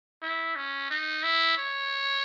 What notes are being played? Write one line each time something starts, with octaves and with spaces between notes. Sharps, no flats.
E4
C#4
D#4
E4
C#5